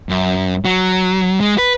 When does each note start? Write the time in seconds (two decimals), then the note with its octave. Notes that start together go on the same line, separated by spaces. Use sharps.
0.09 F#2
0.65 F#3
1.40 G#3
1.58 B4